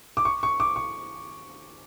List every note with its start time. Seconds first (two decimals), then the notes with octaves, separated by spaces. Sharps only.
0.17 D6
0.25 C#6
0.43 C#6
0.60 D6
0.76 C#6